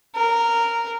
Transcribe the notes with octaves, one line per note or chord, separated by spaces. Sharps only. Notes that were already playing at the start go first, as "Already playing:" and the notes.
A#4